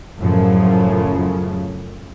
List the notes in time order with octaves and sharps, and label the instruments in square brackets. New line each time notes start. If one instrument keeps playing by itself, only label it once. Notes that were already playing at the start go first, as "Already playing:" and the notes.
[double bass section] F#2 A2 C#3 F3